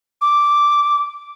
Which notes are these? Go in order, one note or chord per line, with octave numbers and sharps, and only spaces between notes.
D6